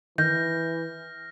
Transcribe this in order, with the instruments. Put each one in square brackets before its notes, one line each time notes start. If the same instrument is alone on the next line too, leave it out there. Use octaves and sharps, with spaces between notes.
[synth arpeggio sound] D#3 [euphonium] E3 [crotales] F6 A#6 [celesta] G6